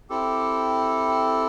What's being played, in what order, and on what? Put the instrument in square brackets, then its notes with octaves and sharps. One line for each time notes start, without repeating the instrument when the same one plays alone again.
[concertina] C4 E4 G4 A4